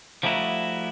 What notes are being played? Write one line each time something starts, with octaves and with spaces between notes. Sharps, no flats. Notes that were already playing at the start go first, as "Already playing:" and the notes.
F3 G3 A3 D#4 E4 F#4